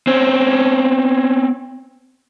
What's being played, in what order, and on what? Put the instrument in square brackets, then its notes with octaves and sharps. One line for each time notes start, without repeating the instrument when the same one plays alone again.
[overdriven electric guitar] C4 C#4